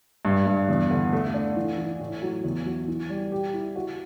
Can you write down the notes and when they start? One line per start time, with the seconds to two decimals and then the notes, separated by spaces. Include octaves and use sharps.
0.25 G2
0.47 G2
0.69 E2
0.91 D3
1.13 A3
1.34 D4
1.56 E3
1.78 E3
2.00 A2
2.23 F#3
2.44 E2
2.66 F#3
2.88 E3
3.10 G3
3.32 G4
3.54 E4
3.76 F#4